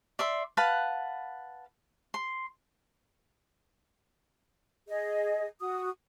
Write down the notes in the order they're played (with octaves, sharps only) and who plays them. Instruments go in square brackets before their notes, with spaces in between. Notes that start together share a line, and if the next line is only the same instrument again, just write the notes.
[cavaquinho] D5 E5 C6
B4 F5 F#5 A5
C6
[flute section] G#4 D#5
F#4 D#6